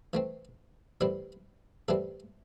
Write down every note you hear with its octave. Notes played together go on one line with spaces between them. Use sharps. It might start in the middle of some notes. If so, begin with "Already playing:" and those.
E3 A3 C4
A2 E3 G3 C4 E4
A2 E3 G3 C4 A4